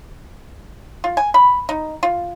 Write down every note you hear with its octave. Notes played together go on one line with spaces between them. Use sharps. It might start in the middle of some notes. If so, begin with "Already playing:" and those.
F4
G#5
B5
D#4
F4